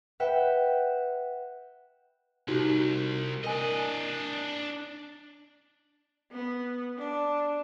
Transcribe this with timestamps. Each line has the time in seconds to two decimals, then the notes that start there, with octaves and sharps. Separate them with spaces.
0.20 B4 E5 F#5 G5
2.48 C2 D#4 F#4 G4
3.44 D4 A#4 D#5 G#5
6.32 B3
6.97 D4